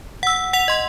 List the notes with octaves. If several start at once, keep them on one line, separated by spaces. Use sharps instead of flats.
F#5 E6
F#5 F7
D#5 C6